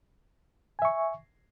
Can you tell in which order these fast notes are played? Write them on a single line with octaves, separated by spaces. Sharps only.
G#5 E5 C#6